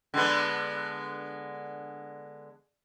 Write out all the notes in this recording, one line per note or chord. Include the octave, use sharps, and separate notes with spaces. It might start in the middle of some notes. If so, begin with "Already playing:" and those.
D3 G#3 B3